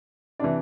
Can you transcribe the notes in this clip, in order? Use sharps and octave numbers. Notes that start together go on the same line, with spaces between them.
C3 E3 D4 D5